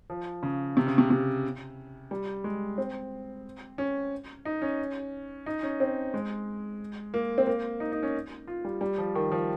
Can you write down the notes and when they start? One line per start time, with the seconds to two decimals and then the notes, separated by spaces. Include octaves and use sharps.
0.10 F3
0.43 C#3
0.77 C3
0.87 C#3
0.98 C3
1.10 C3
2.11 G3
2.44 G#3
2.78 C4
3.78 C#4
4.45 D#4
4.62 C#4
5.46 D#4
5.63 C#4
5.80 C4
6.14 G#3
7.14 A#3
7.38 C4
7.47 A#3
7.80 D#4
7.92 D#4
8.03 C#4
8.48 F4
8.64 G3
8.81 G3
8.98 F3
9.15 D#3
9.32 F3